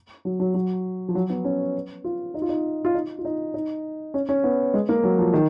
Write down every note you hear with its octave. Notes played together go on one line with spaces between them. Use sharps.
F#3
F#3
F#3
F3
F#3
B3
C#4
F4
D#4
F4
D#4
F4
D#4
F4
D#4
D#4
C#4
C#4
B3
G#3
A#3
F#3
F3
D#3